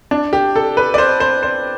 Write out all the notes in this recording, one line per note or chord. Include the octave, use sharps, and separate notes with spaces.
D4
G4
A4
B4
D5
C5
C5
C5